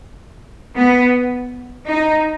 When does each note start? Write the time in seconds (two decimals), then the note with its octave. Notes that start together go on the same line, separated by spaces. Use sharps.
0.76 B3
1.87 D#4